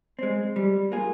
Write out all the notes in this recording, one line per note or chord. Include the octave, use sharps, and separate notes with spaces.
G#3 C4
G3
A#3 F4 G#4